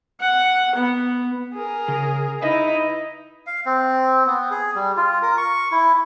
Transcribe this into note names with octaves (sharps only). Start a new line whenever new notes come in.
F#5
B3
G#4 A#4
C#3
D#4 E4 B4 D#5 E5
F5
C4
B3
G#4
G3
F4
A#4
C#6
E4